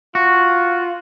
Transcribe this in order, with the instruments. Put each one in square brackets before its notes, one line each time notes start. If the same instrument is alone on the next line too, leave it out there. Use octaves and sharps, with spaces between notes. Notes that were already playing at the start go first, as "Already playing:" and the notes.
[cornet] F4 [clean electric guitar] F#4